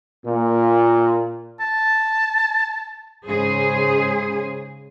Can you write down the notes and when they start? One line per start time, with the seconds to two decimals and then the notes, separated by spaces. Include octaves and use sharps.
0.26 A#2
1.60 A5
3.25 G#2 C#3 G#4 C5